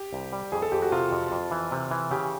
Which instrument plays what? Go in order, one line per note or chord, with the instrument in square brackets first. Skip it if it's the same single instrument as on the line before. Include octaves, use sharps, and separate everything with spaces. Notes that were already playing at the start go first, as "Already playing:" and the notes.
Already playing: [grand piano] G4
[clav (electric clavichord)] C2
G3
[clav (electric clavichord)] F2 [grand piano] G#4
[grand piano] A4
[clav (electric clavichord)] F2 [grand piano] G4
[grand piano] F#4
[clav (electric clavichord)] C3 [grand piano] F4
[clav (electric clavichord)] F2
F2
E3
C3
E3
[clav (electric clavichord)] C#3 [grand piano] G4